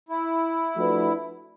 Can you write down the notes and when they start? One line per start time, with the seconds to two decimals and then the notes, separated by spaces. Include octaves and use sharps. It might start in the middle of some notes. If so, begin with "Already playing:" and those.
0.09 E4
0.76 F3 A3 D4 F#4 B4